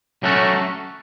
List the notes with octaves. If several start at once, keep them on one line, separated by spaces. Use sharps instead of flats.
F#3 A3 C#4 F#4 A4